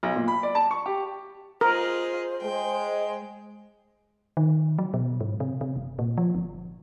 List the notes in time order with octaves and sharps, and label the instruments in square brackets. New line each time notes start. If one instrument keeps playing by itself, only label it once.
[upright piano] B1
A#2
B5
D5
A5
C#6
G4
[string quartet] F4 G#4 D#5 [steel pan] A#4 [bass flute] C5
[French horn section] G#3 [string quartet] G5
[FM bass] D#3
F#3
B2
G#2
C3
C3
F#1
A#2
F3
G1